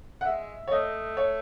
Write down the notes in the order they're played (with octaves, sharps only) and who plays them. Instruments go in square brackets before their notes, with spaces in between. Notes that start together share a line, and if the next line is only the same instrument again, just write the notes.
[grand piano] F#5
[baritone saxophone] G#3 [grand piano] E5
[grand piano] C#5
[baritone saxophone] A3 [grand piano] D#5
[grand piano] C#5